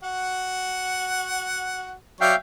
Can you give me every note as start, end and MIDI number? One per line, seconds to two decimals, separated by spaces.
0.03 1.94 66
0.03 1.94 78
2.21 2.33 54
2.21 2.33 73
2.21 2.33 74
2.21 2.36 76
2.21 2.36 77
2.21 2.36 79